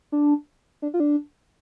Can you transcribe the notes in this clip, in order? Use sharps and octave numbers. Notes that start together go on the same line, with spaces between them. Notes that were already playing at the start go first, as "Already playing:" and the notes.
D4
D4
F4
D4